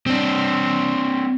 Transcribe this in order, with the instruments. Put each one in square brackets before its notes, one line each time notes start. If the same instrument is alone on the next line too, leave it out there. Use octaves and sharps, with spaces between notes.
[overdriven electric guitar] C4 D4